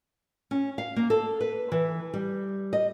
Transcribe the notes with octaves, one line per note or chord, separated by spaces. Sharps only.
C#4
F5
A#3
A4
B4
E3
G3
D#5